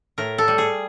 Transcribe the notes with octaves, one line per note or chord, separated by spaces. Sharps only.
A2 A#4
A4
G3
G#4